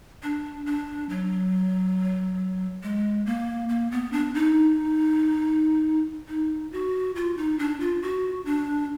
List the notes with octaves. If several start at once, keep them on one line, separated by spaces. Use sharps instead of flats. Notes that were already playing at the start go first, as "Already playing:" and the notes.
D4
D4
F#3
G#3
A#3
A#3
B3
D4
D#4
D#4
F#4
F4
D#4
D4
F4
F#4
D4